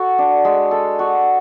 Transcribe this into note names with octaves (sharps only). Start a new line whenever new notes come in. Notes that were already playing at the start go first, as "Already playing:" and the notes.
Already playing: F#4 A4
D4
G#3
A4
F#4